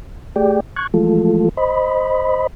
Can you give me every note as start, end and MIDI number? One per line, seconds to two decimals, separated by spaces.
0.36 0.60 57
0.36 0.60 67
0.36 0.60 68
0.36 0.60 74
0.36 0.60 79
0.76 0.87 85
0.76 0.87 90
0.76 0.87 92
0.94 1.49 52
0.94 1.49 53
0.94 1.49 56
0.94 1.49 57
0.94 1.49 65
0.94 1.49 69
1.57 2.47 72
1.57 2.47 75
1.57 2.47 83